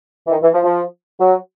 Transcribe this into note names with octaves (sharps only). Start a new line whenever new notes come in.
E3
D#3
E3
F3
F3
F#3